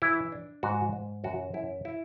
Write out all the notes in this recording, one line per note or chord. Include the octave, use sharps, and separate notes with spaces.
E3 E4
D4
G#2 F#4
G#2
F#2 F#4
F#2 E4
E4